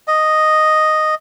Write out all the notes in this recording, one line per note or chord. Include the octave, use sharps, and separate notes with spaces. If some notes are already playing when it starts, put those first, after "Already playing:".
D#5